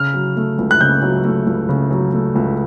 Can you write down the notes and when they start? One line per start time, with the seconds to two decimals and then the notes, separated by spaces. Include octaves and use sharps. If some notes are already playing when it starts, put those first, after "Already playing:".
Already playing: C#3 F6
0.14 F#3
0.37 A3
0.58 C#2
0.71 F#6
0.80 C#3 G6
1.02 F#3
1.25 A3
1.47 C#2
1.69 C#3
1.91 F#3
2.14 A3
2.35 C#2